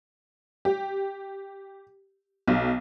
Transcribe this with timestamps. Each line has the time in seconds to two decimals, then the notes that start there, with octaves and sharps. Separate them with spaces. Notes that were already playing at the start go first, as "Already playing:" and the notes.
0.65 G4
2.48 B1